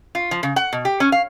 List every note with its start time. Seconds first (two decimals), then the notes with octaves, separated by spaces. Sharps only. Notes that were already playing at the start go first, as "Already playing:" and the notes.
0.15 F4
0.31 F3
0.43 C#3
0.56 F#5
0.73 B2
0.85 G4
1.00 C#4
1.12 F5